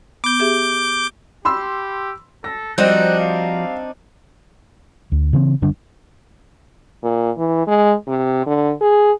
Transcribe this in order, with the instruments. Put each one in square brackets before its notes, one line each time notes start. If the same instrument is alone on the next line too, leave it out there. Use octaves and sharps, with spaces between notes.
[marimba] B3 [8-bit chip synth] D6 G6
[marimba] G4 G#4 E5
[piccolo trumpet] G4 [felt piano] B5 C6 E6
[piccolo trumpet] A4 [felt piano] A#6
[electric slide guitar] F3 F#4 [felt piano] G3 C5 [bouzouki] C4 D4 D#4 [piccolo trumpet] F#6
[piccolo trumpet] F5
[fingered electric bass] D2
C#3 E3 G3 C4
F#1 D3 G3 D4
[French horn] A#2
E3
G#3
C3
D3
G#4